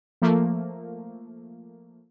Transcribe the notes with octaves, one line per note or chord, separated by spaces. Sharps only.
F3 A3 A#3